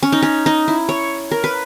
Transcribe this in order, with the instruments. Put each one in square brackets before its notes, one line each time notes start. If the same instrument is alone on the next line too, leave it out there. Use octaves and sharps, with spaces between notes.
[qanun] C#4
D#4
C#4
D#4
E4
C#5
A#4
B4